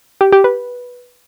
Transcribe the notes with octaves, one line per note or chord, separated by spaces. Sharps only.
G4
G4
B4